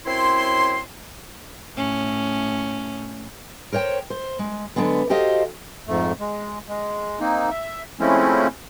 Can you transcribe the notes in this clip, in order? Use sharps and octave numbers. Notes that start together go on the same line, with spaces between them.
F#2 C4 E4 C#5 C6
A2 C#4
A#4 C5 C#5 G5
C5
G#3
D3 F#3 G#3 B3
F#4 G4 A4 C5 D#5 F5
F2 G#2 A3
G#3
G#3
A#3 C4 D#4
E5
F3 G#3 A3 C4 C#4 E4